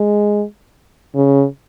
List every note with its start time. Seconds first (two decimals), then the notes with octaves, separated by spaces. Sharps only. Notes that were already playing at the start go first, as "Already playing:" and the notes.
Already playing: G#3
1.15 C#3